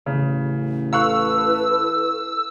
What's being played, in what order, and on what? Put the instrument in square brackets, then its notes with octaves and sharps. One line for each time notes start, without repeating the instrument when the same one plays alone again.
[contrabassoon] A1 [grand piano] C#3
[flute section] E4 A4 B4 [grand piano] F5 C#6 F#6 [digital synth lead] E6